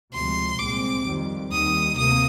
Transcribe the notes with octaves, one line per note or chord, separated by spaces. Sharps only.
D2 C3 F3 G#3 C6
C2 A#2 G#3 C4 D6
F2 D#3 G3 C4
D#2 D#3 G3 D#6
D2 C3 A#3 D#6